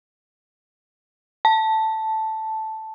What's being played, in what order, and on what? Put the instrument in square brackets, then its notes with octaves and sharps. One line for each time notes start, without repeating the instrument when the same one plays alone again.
[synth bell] A5